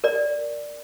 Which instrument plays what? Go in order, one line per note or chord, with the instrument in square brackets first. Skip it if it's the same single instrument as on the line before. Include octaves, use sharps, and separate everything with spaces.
[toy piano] A#4 D5